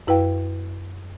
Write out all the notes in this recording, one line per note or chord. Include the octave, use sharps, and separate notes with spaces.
F#2 E4 B4 F5 G5